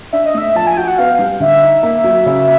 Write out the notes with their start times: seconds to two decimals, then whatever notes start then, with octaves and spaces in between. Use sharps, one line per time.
0.13 D4 E5
0.26 D#5
0.35 A3 E5
0.55 F3 A5
0.67 G#5
0.77 F#4 G5
0.88 F#5
0.98 B3 F5
1.19 G3
1.40 D3 E5
1.62 D#4
1.83 A#3
2.04 F#3
2.26 C#3